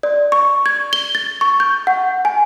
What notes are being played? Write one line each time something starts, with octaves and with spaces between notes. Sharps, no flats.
D5
C#6
G#6
G7
A6
C#6
G6
F#5
G#5